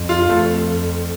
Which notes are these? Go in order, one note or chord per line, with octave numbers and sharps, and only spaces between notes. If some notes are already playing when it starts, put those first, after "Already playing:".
Already playing: F2
F4
F2 A3